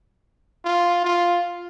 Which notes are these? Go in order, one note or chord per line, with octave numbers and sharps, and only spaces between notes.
F4
F4